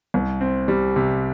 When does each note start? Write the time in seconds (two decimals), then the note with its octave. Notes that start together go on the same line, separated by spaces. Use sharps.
0.14 C2
0.41 C4
0.68 G3
0.96 C3